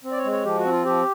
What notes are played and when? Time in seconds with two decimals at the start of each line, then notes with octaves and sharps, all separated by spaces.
0.04 C4
0.11 D5
0.18 C#5
0.24 G#3
0.32 C#5
0.45 F3 G4
0.58 F#4
0.65 C4
0.71 F4
0.85 F3 G4